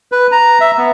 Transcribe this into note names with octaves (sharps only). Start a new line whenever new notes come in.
B4
A#5
E5
B3